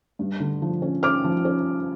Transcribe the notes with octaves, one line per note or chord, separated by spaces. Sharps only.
G2
D3
F3
C#4
C#4 D6 F6
F3
C#4